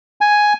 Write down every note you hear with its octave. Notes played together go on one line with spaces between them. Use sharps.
G#5